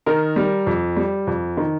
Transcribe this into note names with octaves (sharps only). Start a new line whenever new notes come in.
D#3 A#4
G3
F2
G3
F2
D#3